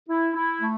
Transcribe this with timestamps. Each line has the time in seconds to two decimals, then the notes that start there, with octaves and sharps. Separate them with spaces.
0.09 E4
0.35 E4
0.61 A3